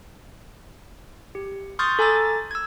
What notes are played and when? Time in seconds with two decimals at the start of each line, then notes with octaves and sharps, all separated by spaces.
1.35 G4
1.79 C6 C#6 D#6 F6 G6 A6
1.99 A4 G#5 A#5 D6 E6 A6
2.51 E6 G#6